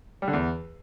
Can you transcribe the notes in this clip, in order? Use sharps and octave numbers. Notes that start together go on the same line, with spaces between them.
G3
D3
E2